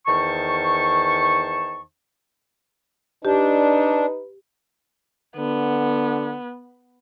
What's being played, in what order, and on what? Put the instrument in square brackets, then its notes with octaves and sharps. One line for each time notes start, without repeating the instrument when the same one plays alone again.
[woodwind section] E2 D#3 C5 A5 C#6
[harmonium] D4 [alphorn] D#4 [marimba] G4 [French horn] B4
[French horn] D3 [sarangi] B3